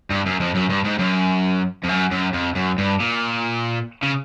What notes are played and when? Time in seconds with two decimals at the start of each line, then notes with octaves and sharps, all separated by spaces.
0.10 G2
0.26 F#2
0.40 F2
0.55 F#2
0.70 G2
0.85 G#2
0.99 F#2
1.84 F2
1.89 F#2
2.11 F#2
2.33 F2
2.55 F#2
2.78 G2
3.00 A#2
4.03 C#3